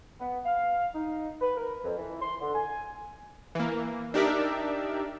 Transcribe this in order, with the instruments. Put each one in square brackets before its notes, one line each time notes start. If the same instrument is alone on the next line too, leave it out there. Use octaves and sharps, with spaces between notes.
[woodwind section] B3
F5
D#4
B4
A#4
F2
E3
C6
D3
G#5
[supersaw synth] E3 A#3
D4 D#4 G4 A#4 D5 E5